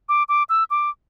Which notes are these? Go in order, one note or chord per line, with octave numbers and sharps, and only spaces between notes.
D6
D6
E6
D6